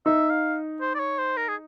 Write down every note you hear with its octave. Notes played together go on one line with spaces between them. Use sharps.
D#4 E5
F5
C5
D5
C#5
C5
A#4
G#4